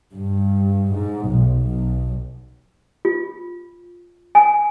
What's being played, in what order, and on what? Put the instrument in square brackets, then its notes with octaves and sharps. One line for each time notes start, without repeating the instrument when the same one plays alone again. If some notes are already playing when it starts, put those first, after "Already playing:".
[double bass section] G2
G#2
B1
B1
[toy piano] F4
G#5